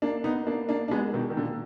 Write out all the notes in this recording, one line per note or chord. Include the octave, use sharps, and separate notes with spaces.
A#3 D4
B3 D#4
A#3 D4
A#3 D4
D4
G#3 B3
B2 D#3
D#3
A#2 D3